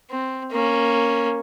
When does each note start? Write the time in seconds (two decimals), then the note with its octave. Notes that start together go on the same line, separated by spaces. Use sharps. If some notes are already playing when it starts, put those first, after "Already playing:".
0.11 C4
0.51 A#3 C#4